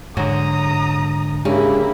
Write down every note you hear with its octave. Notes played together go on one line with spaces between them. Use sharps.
G#2 D3 F#3 A#5 D#6
C#3 G#3 A#3 D4 E4 G4